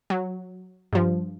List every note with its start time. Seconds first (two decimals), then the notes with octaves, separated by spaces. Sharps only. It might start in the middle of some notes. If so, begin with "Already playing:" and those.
0.10 F#3
0.93 G2 F3